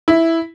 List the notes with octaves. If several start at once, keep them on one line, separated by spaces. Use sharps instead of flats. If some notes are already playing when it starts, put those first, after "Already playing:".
E4